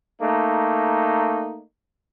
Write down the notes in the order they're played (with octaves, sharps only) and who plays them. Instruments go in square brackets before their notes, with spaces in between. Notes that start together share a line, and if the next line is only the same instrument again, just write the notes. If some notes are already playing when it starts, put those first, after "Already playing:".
[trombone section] A3 A#3 D#4